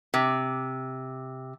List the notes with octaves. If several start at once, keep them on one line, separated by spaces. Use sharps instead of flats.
C3